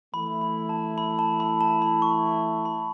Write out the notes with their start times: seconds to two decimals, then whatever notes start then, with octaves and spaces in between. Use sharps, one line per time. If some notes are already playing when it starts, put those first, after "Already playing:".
0.14 E3 A3 E4 B5
0.41 B5
0.69 A5
0.98 B5
1.19 A5
1.40 B5
1.61 A5
1.82 B5
2.02 C#6
2.65 B5